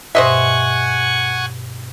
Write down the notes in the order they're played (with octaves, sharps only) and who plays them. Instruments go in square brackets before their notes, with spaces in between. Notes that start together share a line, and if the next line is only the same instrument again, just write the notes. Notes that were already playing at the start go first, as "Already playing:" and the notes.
[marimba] G2 B2 [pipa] C5 D#5 E5 [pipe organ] F#5 G#5 C#6